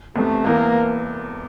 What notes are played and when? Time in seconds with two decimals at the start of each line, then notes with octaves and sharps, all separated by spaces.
0.16 F1 E2 C3 A3
0.45 E1 E2 E3 A#3